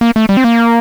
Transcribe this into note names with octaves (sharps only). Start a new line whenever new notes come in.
A#3
A3
G3
C4
A#3